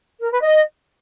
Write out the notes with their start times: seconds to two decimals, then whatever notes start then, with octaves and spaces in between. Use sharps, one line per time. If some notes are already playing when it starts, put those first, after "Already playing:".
0.21 A#4
0.31 B4
0.42 D#5